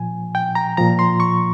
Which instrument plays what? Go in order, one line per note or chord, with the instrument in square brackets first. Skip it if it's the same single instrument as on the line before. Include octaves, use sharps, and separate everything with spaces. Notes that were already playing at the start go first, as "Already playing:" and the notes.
Already playing: [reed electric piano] A#2 F3 G#5
G5
A#5
A#2 F3 A#5
C6
C#6